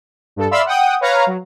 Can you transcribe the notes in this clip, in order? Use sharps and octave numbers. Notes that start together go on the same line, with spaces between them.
G2 A4
D5 E5 F5 B5 C6 E6
F#5 G5 D#6
B4 C#5 F5 A#5
F#3